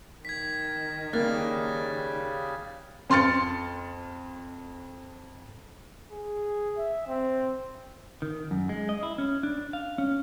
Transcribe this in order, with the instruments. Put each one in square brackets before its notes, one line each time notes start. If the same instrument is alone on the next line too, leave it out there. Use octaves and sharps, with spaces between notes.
[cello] D#3 [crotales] G#6 B6
[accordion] C#3 G3 [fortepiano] A#3 [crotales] F6 F#6 A6
[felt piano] F2 C6 F6 A6 C#7
[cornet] G#4
E5
C4
[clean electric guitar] D#3
F#2
G#3
D#5
E4
C#4
D4
F5
C#4